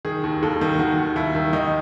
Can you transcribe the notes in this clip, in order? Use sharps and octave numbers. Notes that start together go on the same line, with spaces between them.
D#3 G#4
D#2
D#2 A4
D#3
D#3 F#4
D#2
D#2 E4
D#3
D#3 D#4